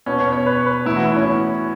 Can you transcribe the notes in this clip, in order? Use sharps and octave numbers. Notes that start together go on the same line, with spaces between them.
B2 B3 C#4
C#5
C#5
B4
B4
A2 E3 B3 E4
F#4
E4
C#4